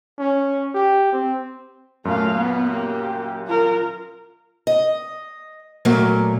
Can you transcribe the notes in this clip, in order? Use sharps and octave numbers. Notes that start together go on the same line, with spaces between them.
C#4
G4
C4
F#2 A#2 A3 F5
B3
A#3 G4
F4 A#4
D#5
A#2 F#3 A3 A#3